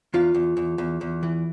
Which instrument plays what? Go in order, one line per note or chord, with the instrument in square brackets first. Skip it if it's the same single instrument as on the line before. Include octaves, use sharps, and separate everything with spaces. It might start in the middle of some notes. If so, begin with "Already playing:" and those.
[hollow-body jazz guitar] E2 F4
E2
E2
E2
E2
E3